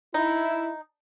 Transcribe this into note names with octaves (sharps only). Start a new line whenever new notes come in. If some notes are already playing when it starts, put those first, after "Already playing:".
D#4 E4